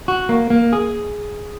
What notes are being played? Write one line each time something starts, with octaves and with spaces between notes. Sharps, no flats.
F#4
A#3
A#3
G#4